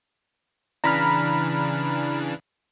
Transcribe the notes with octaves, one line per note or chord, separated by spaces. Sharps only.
C#3 E3 D4 A#5 B5 F6